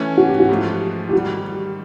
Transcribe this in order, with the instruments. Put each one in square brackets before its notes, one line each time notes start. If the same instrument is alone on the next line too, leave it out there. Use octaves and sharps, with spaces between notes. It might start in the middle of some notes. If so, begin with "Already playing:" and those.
Already playing: [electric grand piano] E3 A3 C#4
[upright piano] F#4
G4
F#4
[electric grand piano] G#2 F3 A3
[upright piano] G4
[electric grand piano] G#2 D#3 G3 [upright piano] F#4